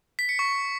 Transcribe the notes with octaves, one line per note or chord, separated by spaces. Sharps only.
B6
C#7
C#6